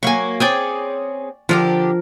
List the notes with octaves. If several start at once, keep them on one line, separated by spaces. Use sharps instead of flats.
F#3 A#3 G#5 C#6
C4 C#4 G#4 D5 G5 G#5
D3 F3 D4 G4 A#4